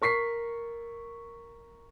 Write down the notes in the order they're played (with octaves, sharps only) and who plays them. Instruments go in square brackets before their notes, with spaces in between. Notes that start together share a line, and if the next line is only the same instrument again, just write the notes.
[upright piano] A#4 C#6 B6 C7